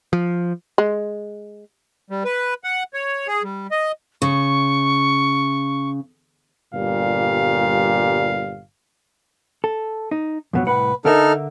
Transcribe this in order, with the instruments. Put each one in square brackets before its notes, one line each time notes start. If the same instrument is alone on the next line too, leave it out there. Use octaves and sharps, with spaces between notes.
[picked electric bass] F3
[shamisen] G#3
[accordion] G3
B4
F#5
C#5
G#4
G3
D#5
[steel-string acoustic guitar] C#3 [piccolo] C#6
[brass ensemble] G1 A#2 G3 F5
[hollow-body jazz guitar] A4
D#4
F2 B2 F#3
[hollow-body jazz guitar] C2 A2 F#5 [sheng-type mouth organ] B4
[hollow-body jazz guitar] D3 A#4 E5 [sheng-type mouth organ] D#4 A4 F6